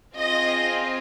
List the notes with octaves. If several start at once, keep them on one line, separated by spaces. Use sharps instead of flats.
C4 F4 G#4 D#5